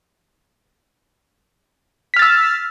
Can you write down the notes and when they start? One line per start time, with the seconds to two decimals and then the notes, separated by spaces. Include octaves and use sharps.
2.14 B6
2.16 F6
2.19 A6
2.22 E6